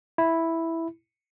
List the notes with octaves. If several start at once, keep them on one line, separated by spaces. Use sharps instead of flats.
E4